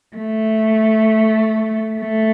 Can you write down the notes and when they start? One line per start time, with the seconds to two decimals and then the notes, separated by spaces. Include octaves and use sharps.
0.16 A3
2.00 A3